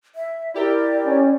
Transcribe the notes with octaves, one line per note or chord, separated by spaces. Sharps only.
E5
E4 G4 A#4 D5
C#4